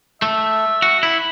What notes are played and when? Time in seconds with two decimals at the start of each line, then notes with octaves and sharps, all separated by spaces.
0.22 A3 E5
0.82 F#4
1.03 E4